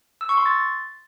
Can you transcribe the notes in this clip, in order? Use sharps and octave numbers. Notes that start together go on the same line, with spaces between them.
E6
C#6
C6
A6